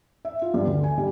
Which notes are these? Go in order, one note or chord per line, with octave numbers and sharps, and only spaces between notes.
E5
F4
G2
D2
G#5
G3